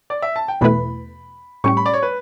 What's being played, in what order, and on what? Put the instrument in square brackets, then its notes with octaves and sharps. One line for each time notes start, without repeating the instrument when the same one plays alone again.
[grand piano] D5
E5
A5
G5
[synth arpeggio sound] E2 B2 A3 E4 B4 [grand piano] B5
[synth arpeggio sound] A2 G3 C#4 G4 [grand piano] C#6
[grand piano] B5
D5
C#5
B4